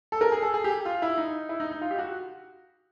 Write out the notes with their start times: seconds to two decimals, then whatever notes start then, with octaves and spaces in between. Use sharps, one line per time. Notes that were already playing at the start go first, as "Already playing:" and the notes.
0.12 A4
0.21 A#4
0.32 G#4
0.42 A4
0.54 G#4
0.64 G4
0.85 F4
1.02 E4
1.18 D#4
1.49 E4
1.60 D#4
1.72 D#4
1.81 F4
1.91 G4
1.99 F#4